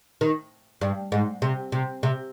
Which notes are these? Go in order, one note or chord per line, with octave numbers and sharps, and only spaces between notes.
D#3
G2
G#2
C3
C3
C3